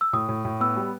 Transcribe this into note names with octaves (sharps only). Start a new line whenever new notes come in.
E6
A2 D#6
A2
A2
B3 E6
G3